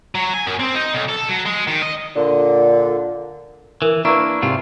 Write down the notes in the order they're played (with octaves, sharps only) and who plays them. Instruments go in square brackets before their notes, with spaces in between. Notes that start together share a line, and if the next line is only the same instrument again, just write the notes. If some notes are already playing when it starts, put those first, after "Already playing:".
[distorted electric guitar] F#3
G#5
F#2
C4
D#4
B1
A4
F#3
G#3
D#3
D#5
[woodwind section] A#2 D3
[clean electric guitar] E3 [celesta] A#4
[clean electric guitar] A#3 D4 [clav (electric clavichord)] E4 B4 [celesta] A#5 C#6 E6
[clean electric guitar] G#2 C3 F4